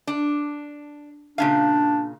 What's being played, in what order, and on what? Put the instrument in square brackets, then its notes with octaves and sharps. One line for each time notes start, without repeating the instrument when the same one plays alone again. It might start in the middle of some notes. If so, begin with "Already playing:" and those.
[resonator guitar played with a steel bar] D4
[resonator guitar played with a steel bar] A#2 C#3 F5 [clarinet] D4